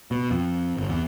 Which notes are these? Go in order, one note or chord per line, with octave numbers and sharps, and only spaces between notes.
B2
F2
G1
E2